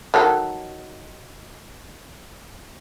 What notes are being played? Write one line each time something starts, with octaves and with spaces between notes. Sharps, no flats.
D#3 F#3 A4